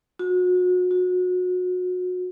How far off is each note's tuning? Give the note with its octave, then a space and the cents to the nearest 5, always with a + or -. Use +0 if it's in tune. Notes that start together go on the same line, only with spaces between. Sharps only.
F#4 -35
F#4 -30